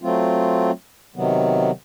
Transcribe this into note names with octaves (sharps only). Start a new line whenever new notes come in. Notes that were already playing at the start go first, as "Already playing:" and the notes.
F#3 A3 C4 F4
C3 D#3 F#3 B3